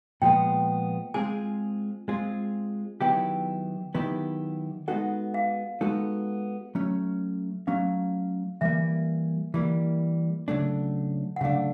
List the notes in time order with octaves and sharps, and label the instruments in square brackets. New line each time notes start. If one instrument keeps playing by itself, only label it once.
[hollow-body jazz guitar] A#2 F3 G#3 B3 [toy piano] G5
[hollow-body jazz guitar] G#3 C4 F4 G#4 [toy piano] G#5
[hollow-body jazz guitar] G#3 C4 F4 G#4
[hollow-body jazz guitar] D#3 F#3 B3 E4 G4 [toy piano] G5
[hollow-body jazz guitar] D#3 F#3 B3 E4 G4
[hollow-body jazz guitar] G#3 B3 D#4 F#4 A4 [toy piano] F#5
[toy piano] F5
[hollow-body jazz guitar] G#3 B3 D#4 F#4 A4
F#3 A3 C#4
[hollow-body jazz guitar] F#3 A3 C#4 [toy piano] F5
[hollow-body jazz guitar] E3 G3 A#3 [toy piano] E5
[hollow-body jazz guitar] E3 G3 A#3
C#3 F#3 A3 D4
[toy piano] F#5
[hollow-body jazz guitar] C#3 F#3 A3 D4 [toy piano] F5